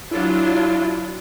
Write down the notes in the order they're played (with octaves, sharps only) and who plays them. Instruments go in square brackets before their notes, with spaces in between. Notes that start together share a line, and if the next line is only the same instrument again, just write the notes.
[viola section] F#3 D4 F4 [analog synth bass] E4